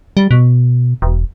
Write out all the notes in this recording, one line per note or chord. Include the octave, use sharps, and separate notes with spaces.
G3
B2
E1